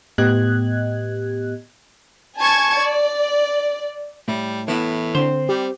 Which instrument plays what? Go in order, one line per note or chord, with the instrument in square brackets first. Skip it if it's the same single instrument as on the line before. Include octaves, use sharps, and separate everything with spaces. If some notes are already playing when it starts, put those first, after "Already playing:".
[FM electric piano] A2 B3 G4 D#5 F#6 G#6
[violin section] G#5 A5 C#6 G#6
D5
[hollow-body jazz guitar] A2 [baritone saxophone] G3
[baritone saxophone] A2 [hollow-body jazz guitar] E3 B3 E4
[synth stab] D3 [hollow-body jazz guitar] C4 C5
[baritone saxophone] G3 [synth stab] G4